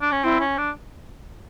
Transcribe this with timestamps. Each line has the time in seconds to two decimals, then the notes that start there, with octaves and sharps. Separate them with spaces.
0.02 D4
0.12 C#4
0.23 C4 E4
0.40 C#4
0.58 D4